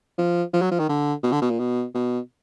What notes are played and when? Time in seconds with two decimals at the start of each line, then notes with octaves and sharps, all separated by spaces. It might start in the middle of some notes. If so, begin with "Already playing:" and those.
0.18 F3
0.53 F3
0.61 F#3
0.71 F3
0.79 D#3
0.89 D3
1.23 B2
1.32 D3
1.41 B2
1.50 A#2
1.59 B2
1.94 B2